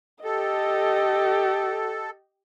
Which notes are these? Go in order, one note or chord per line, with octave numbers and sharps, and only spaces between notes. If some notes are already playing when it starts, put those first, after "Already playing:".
G4 A4 D#5